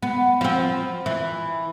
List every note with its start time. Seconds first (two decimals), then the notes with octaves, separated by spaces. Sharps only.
0.03 B3
0.41 F3 C4
1.06 E3